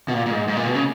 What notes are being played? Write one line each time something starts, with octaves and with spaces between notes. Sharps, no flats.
B2
A#2
A#2
G#2
G#2
A#2
B2
C#3